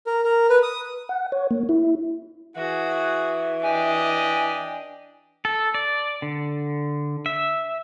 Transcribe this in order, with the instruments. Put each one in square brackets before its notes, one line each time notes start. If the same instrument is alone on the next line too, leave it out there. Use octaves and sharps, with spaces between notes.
[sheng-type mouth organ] A#4
A#4
B4
D#6
[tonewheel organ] F#5
C#5
A#3
E4
[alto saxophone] E3 [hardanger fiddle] F#4 [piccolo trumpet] G#4
[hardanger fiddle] D4 G4 [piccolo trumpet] D#5 [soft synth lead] G#5
[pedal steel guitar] A4
D5
D3
E5